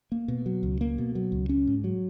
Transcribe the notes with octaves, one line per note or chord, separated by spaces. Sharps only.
A#3
B2
F#3
C#2
A#3
B2
F#3
C#2
C#4
G#2
F#3